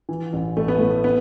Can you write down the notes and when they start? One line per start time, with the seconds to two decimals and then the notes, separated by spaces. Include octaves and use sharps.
0.09 E3
0.33 A1
0.57 A1 A3
0.68 B3
0.78 A2 A3
1.04 B3